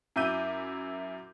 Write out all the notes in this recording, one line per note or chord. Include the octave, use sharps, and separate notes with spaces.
F#2 E4 E5 D6 G6 D#7